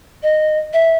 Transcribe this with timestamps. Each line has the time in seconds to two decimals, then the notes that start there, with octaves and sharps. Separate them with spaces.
0.23 D#5
0.73 E5